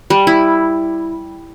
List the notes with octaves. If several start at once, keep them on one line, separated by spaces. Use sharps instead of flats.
G3
E4